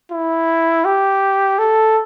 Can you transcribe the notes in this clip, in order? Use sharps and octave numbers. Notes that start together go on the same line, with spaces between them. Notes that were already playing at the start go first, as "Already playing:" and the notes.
E4
G4
A4